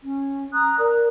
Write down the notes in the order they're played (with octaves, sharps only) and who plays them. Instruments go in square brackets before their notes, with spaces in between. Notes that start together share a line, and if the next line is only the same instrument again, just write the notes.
[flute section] C#4
A#5 D#6 F#6
A#4 D5